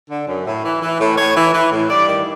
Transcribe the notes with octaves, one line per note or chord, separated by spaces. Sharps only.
D3
F#2
A2
E3
E3
A2
A2 C#5
E3
E3
A2
G2 D5
D#3